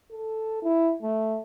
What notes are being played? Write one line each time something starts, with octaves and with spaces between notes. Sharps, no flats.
A4
E4
A3